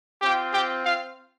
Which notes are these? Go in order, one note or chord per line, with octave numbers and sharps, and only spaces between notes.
C4 F4 G4 G5
G4 G5
F4 F5